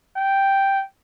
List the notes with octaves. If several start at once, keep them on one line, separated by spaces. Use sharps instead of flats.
G5